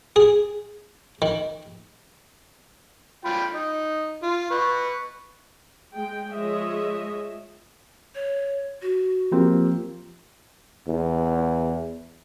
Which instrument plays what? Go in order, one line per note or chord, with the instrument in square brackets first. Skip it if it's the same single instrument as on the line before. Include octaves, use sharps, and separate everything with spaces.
[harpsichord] G#4
D#3
[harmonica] F4 G5 B5
D#4
F4
B4 C#6
[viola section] G#3 G5
F3 G#3 C#5 D#5 E5
[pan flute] C#5
F#4
[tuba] F3 [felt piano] A#3 C4 G4
[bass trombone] E2